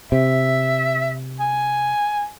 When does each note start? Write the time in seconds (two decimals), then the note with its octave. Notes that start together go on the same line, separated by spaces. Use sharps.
0.12 C3 E5
1.40 G#5